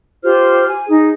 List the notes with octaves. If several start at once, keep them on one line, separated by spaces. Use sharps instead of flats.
F4 G4 C5 F6
G#5
D#4 G#4